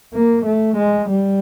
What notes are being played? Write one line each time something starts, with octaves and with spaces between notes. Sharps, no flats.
A#3
A3
G#3
G3